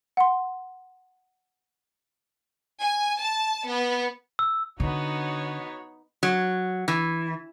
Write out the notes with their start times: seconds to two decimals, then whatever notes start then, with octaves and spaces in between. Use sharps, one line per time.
0.17 F#5 C6
2.80 G#5
3.23 A5
3.69 B3
4.39 E6
4.80 D3 B3 D#4 F#4 C#5
6.23 F#3
6.88 E3